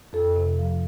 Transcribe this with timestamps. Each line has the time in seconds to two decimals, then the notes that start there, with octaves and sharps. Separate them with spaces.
0.13 F2 A4
0.36 C3
0.59 F3